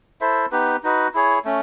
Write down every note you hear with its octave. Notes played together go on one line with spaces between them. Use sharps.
E4 A4 C5 E5
B3 D#4 G4 B4
D#4 F#4 B4 D#5
E4 G#4 C#5
A3 C#4